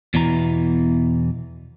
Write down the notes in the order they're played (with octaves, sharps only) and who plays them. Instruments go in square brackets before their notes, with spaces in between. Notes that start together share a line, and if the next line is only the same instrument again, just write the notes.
[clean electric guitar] E2 B2 E3 A#5